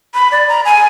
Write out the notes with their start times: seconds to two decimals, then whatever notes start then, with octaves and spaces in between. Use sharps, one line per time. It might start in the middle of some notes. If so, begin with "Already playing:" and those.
0.14 B5
0.32 D5
0.48 A#5
0.65 G#5